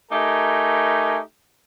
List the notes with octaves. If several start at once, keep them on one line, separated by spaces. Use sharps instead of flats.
A3 D#4 G4 A#4 G#5